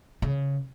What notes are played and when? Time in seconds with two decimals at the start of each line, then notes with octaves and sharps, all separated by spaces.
0.22 C#3